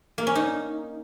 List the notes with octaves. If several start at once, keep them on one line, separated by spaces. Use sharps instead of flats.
A#3
C#4
D#4